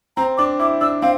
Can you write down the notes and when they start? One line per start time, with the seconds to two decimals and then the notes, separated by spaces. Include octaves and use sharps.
0.17 C4 A#5
0.38 D4 D6
0.59 E4 D6
0.81 D4 E6
1.02 C4 F5